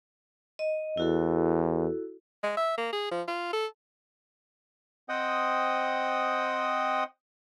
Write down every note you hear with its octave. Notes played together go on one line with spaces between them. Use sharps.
D#5
E2 E4 F#4 A4
G#3
E5
A#3
G#4
F3
F4
A4
C4 C5 D#5 F#5 G5 D#6